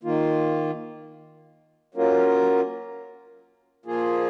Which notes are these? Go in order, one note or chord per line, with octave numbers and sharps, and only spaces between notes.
D#3 A#3 F4
F#3 A#3 C#4 F4 A#4
A#2 F3 A#3 F4 G#4